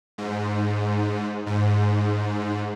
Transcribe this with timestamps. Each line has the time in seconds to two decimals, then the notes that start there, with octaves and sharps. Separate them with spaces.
0.18 G#2
1.46 G#2